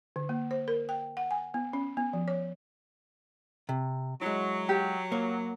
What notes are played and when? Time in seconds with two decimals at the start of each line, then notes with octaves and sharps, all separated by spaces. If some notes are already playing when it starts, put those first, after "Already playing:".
0.16 D3
0.29 A#3
0.51 C5
0.68 A#4
0.89 G5
1.17 F#5
1.31 G#5
1.54 B3
1.73 C#4
1.97 B3
2.13 F3
2.28 C#5
3.69 C3
4.22 F#3 G#3 E4
4.69 G4
5.12 A#3 C#5